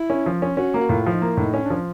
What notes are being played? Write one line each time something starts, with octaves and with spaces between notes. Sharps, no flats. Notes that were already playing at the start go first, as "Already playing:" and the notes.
Already playing: E4
C#4
F3
C#4
C#4 F#4
A#3
F#4
A2 F4
F3
D#4
A#3 E4
A2 D4
D#4
C#4
D4
F3